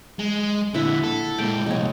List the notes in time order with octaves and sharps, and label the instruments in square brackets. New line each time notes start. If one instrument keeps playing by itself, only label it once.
[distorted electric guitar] G#3
[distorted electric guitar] A#2 D3 [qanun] E4 E5 F#5
[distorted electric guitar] A4
[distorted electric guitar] A#2 G#3 [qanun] G5
[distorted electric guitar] C2 F2 [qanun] G#3 C#5